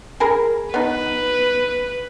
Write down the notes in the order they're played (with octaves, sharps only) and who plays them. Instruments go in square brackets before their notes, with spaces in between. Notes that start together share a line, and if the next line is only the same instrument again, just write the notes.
[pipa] G#4 A#4 B5
[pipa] B3 D#4 [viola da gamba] B4